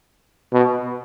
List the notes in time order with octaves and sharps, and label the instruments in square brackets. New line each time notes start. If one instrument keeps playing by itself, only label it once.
[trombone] B2